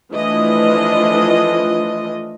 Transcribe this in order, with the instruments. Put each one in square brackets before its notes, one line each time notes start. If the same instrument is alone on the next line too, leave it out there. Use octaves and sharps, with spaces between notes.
[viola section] E3 F3 A3 D4 F4 D#5